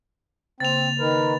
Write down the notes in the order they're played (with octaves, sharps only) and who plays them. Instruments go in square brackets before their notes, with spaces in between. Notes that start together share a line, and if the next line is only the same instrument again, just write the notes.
[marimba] C#3 A#3 [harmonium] C4 [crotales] A6 F7
[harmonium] D#3 A#4 [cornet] B4